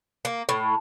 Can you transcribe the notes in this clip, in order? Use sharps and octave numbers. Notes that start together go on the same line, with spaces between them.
A#3
A2